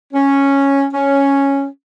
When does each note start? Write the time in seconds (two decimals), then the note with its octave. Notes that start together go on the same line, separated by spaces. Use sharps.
0.12 C#4
0.92 C#4